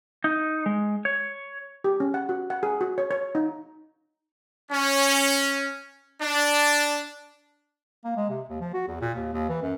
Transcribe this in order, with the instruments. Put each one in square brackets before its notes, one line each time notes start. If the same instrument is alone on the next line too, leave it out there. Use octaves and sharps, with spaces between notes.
[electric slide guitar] D#4
G#3
C#5
[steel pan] G4
C#4
F#5
F#4
F#5
G#4
F#4
C#5
C#5
D#4
[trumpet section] C#4
D4
[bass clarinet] A#3
G#3
C3
D#2
F3
F#4
E2
A#2
D#2
D#2
E3
F#2